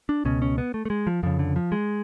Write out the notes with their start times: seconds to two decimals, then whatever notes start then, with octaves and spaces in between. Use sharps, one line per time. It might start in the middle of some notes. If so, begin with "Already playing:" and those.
0.09 D4
0.25 C#2 B2 C#4
0.42 C#4
0.58 B3
0.74 A3
0.85 A3
0.90 G#3
1.07 F3
1.23 F2 C#3 F3
1.39 D3
1.56 F3
1.72 G#3